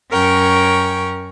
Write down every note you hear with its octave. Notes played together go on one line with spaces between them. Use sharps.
F#2 C#4 A#4 G5 C#6